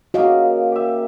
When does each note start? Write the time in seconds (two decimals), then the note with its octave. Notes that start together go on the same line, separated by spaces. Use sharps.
0.14 C#3 A#3 F#4 D#5 F5
0.72 G4 E5